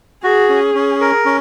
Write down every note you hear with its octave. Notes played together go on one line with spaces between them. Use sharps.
F#4 G#4
C#4
C#4
A#4
C#4